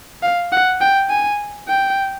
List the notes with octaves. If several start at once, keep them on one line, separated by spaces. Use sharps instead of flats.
F5
F#5
G5
G#5
G5